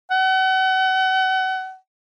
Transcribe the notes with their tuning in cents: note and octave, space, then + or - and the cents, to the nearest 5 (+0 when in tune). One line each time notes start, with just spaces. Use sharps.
F#5 +35